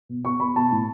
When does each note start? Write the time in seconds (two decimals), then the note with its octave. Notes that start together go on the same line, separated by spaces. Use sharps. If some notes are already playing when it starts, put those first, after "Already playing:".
0.09 B2
0.25 B3 C#6
0.40 B3 B5
0.56 B2 A5
0.72 A2